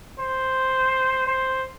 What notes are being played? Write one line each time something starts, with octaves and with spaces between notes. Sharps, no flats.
C5
C5